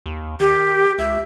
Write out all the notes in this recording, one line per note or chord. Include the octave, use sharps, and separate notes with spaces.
D#2
D#3 G4
C#2 E5